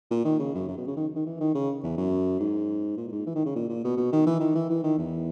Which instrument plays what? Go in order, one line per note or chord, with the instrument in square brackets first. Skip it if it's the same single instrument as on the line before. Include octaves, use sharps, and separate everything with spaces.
[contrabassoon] A#2
D#3
C#3
F#2
F#2
B2
C#3
D#3
D#3
E3
D#3
C#3
E2
F#2
G#2
A#2
A#2
G#2
E3
D#3
C#3
A#2
A#2
B2
B2
D#3
E3
D#3
E3
E3
D#3
E2